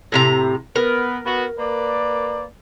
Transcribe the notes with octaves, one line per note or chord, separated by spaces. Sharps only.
A2 C3 A#5
B3 A#4
B3 F#4
A#3 B4 D5